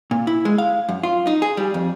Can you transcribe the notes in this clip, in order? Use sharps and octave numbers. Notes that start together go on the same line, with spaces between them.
A#2
E4
G#3
F5
F#2
F4
D#4
G#4
G3
F2